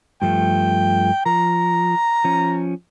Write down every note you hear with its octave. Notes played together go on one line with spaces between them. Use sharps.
G2 F3 A3 G5
F3 A#5
F3 C#4